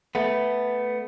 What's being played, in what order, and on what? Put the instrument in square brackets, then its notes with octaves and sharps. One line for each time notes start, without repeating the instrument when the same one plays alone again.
[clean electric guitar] A3 B3